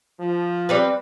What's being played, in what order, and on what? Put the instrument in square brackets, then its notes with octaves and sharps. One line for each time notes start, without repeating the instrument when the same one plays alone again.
[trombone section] F3
[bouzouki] G3 C4 B4